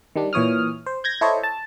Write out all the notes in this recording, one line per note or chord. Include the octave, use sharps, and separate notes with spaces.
D#3 G3 D4
A#2 E3 C#5 D#6 F6
C5
G6 G#6 A#6
E4 A4 C5 C#5 D#5
A5